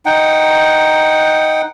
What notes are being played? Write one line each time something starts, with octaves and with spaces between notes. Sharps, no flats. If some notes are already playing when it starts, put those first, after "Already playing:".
D#4 F#5 G5